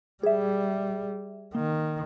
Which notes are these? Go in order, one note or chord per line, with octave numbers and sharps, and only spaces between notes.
G3 G#4 E5
D#3 A#3